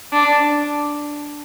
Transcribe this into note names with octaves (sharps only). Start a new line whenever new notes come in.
D4